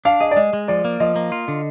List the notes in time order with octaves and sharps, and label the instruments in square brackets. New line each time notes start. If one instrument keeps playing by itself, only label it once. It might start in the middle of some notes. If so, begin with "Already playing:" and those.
[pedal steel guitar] D4 [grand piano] F5
[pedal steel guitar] G#4 [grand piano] D#5
[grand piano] D5
[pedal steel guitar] G#3 [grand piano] D#5
[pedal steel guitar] G#3
[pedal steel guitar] F3 [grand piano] D5
[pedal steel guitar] A#3
[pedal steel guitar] F3 [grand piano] D#5
[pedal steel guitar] A#3
F4
D3